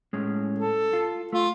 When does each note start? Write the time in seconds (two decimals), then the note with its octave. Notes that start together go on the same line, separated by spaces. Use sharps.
0.13 A2 G#3 C#4
0.58 A4
0.93 F4
1.32 A3 F4